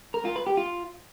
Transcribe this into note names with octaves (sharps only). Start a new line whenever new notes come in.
A#4
F4
B4
G4
F4